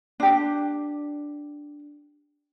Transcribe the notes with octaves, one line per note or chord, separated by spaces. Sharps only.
D4 G4